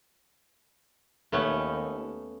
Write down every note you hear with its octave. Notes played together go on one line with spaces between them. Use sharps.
D#2 A3 B3 C#4